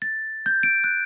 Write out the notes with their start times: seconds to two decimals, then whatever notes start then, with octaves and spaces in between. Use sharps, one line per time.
0.02 A6
0.46 G6
0.63 D7
0.84 F#6